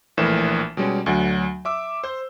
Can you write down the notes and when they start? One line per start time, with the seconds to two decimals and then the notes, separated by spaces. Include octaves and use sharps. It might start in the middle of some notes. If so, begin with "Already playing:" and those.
0.17 A#1 A2 E3 A#4 E7
0.77 B2 G3 G#3 C#4
1.06 D2 F#3 F#5
1.65 E5 D6 E6
2.04 C5 G6